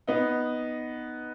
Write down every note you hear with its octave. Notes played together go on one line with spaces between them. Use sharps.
B3 D#4